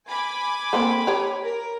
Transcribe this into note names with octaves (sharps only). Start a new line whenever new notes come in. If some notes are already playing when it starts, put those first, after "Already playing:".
G#5 B5 D6
A#3 C4 A4
G4 C#5 A#5
A#4